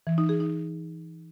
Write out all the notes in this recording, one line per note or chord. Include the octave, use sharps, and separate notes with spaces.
E3
D#4
G#4
D#4